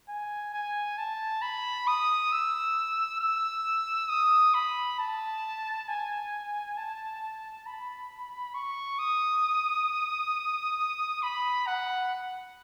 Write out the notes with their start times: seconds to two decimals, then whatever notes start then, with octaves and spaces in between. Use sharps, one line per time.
0.09 G#5
0.54 G#5
0.98 A5
1.42 B5
1.87 D#6
2.32 E6
3.21 E6
4.09 D#6
4.54 B5
4.99 A5
5.88 G#5
6.77 A5
7.66 B5
8.54 C#6
8.99 D#6
11.23 B5
11.67 F#5